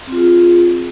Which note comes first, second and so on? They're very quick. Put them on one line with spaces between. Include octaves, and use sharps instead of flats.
C4 F4 G#4